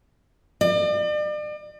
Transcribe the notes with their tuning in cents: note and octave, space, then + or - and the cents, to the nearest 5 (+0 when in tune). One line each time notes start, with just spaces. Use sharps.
D5 +40